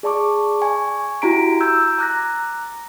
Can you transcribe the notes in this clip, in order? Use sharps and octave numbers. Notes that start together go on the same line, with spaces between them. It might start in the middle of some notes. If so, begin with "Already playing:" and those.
G#4 D5 A5 C#6 D6
G#5 C#6
E4 F#4 G4 A#5 B6 D7
A#5 E6 G6 G#6
A#5 D6 F#6 A6 A#6